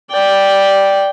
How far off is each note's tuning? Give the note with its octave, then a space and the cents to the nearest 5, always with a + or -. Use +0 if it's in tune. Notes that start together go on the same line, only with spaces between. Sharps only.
D5 +0 G5 +0